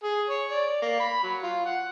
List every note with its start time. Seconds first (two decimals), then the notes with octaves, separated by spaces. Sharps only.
0.04 G#4
0.28 C#5
0.51 D5
0.82 A#3
1.00 B5
1.23 F#3
1.43 F4
1.65 F#5